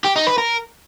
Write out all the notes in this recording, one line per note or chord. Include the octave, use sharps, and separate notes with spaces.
G4
D#4
B4
A#4